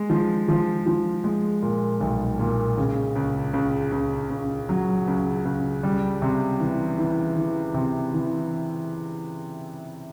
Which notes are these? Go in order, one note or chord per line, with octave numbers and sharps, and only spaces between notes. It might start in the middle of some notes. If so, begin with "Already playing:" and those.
Already playing: G#3
F3
F3
F3
G#3
A#2
B1
A#2
C#3
C#2
C#2
C#2
C#2
F#3
C#2
C#2
G3
C3
E3
E3
E3
C3
E3